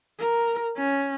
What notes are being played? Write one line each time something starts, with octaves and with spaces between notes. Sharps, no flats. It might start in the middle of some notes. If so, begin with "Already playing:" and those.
A#4
C#4